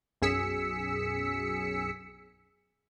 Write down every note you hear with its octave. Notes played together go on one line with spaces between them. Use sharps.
B1 F#2 G#4 E6 B6 C#7